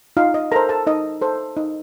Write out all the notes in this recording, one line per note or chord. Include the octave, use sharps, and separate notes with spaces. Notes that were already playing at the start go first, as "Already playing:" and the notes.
D#4 F4 F5
D#5
A4 A#4 C5 A#5
A4 A5
D#4 D#5
A4 C5
D#4